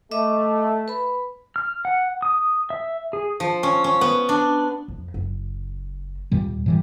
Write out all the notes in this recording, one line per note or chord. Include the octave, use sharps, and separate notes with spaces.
A3 D#5 E5 D6
B4 B5
F6
F#5
D#6
E5
G#4
F3
C#4
C#4
B3
D4
F2
F#1
D#2 A#2 G3
A2 E3 G3